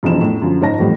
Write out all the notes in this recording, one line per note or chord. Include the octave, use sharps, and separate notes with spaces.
E1 F2 G3 E4 E7
A2
F#2 D3 F3
G#2 D#4 C#5 A5 A#6
A1 F2 A2 G3